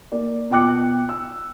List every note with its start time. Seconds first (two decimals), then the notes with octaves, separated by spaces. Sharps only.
0.12 A#3 D5
0.50 B2 F4 G5 D6 F#6 C#7
1.09 E6